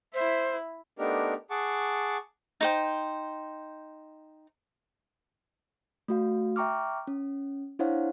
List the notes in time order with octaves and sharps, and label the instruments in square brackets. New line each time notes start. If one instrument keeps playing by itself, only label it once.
[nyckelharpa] E4 E5 [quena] C5
[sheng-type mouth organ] A3 B3 D4 D#4 G4 A#4
G#4 F#5 A5 C#6 D6
[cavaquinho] D#4 C5 G5
[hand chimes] A3 F#4 F5
E5 G5 A#5 C#6 D6 F6
C#4
D4 E4 C5 C#5 F5 F#5